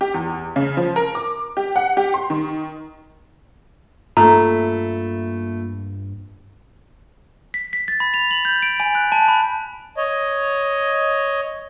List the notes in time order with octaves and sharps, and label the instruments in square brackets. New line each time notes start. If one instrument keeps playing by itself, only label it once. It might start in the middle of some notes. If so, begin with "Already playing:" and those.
[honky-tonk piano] G4
E2
C#3
F3
A#4
D6
G4
F#5
G4
C6
D#3
[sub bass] G2 [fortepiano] A3 [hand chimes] A#3 F4 [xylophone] A#5
[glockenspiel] B6
B6
A6
B5
F7
F#7
G6
D7
G#5
F#6
A5
B5
[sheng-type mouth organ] C#5 D#5